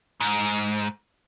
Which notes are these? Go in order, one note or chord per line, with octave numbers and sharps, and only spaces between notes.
G#2